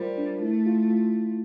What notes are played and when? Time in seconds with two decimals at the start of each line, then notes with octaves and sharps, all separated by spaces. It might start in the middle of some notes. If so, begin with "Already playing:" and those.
Already playing: G3 F4 A#4 C5 D5
0.18 D4
0.42 A3 E4
0.66 F4
0.90 F4